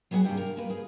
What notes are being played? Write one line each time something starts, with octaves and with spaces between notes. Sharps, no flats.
F#3 G3 G#4 A4 F#5 G#5
G2 C3 G3 G5
A#4
A#3 B4
G#4